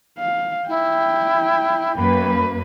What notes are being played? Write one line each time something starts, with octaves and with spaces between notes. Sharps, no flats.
F5
E4 G5
F#2 A#3 B4 B5